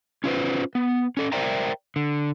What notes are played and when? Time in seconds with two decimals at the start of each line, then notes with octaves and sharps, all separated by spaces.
0.24 C#4 F4 G#4 B4 C5
0.75 B3
1.17 C#4 A4
1.32 A#4 C5 D5 E5 G5 A#5
1.96 D3